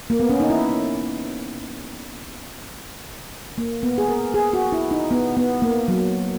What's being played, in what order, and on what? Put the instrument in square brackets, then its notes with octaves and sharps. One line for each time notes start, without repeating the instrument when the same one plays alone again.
[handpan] A#3
B3
C#4
D#4
E4
A#3
B3
G#4
A#4
G#4
F#4
E4
D#4
B3
B3
A#3
F#3